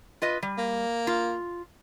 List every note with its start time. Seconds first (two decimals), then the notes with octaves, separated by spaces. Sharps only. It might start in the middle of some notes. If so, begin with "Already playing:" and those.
0.22 F4 B4 D#5
0.43 G3
0.58 A#3
1.07 F4